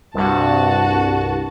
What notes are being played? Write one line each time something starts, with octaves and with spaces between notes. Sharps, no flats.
C2 G2 F#4 A5